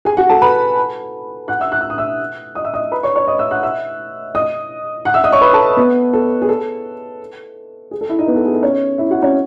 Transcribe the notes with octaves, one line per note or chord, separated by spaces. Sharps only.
G#4 G#5
F#4 F#5
A4 A5
B4 B5
F#5 F#6
E5 E6
F#6
E6
D#6
E5 E6
D#5 D#6
E5 E6
D#5 D#6
B4 B5
C#5 C#6
C#5 C#6
D#5 D#6
E5 E6
F#5 F#6
E5 E6
D#5 D#6
F#5 F#6
E5 E6
D#5 D#6
C#5 C#6
B4 B5
A4 A5
B3 B4
A4
G#4
A4
G#4
A4
E4 E5
D#4 D#5
B3 B4
A4
G#4
A4
C#4 C#5
E4 E5
F#4 F#5
C#4 C#5